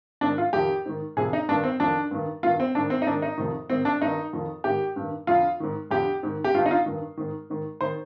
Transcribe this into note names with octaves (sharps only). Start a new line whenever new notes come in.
G#2 D#3 D4
F4
F2 D#3 G4
G#2 D#3
F2 C3 D#3 G#4
D#4
G2 D#3 D4
C4
F2 D#3 D4
G2 D#3
G2 D#3 F4
C4
G#2 D#3 D4
C4
D#4
G#2 D#3 D4
D#4
F2 C3 D#3
G#2 D#3 C4
D4
G2 D#3 D#4
F2 D#3
G#2 D#3 G4
G2 D#3
F2 D3 F4
G#2 D#3
F2 D3 G4
G#2 D#3
G4
G2 D3 F4
D#4
F4
G2 D#3
G#2 D#3
G#2 D#3
D#3 C5